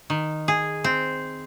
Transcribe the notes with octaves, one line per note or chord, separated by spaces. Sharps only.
D#3
G#4
C4